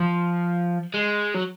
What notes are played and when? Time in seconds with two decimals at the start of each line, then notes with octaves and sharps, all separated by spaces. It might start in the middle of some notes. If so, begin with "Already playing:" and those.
Already playing: F3
0.94 G#3
1.34 F#3